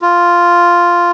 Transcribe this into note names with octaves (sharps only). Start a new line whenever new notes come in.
F4